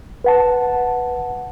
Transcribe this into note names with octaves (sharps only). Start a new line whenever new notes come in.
B4 F#5 A5